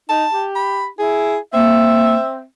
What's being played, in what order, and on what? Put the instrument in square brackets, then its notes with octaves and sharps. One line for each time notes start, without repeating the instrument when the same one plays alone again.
[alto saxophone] D#4 [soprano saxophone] A5
[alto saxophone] G4
[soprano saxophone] B5
[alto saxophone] E4 [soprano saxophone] G#4
[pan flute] A#3 [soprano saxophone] C4 [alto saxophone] E5